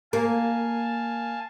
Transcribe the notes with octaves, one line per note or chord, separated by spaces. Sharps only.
A#3 F5 G#5 A5